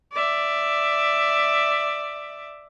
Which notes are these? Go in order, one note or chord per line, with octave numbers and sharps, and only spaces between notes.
D5 E5